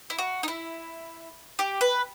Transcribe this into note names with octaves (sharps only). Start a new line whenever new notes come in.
E4
F#4
D#4
E4
G4
B4